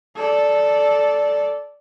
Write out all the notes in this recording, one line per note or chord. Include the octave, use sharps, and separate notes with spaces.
A4 D5